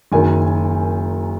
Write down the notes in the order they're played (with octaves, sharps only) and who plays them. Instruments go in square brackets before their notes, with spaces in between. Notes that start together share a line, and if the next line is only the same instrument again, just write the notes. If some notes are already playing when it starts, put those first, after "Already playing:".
[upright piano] F#1 F#2 D#3 G#5